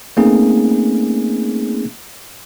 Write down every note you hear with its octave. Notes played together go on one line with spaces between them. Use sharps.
A3 A#3 C4 C#4 D#4 G#4